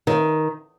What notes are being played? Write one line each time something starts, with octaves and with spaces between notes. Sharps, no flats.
D#3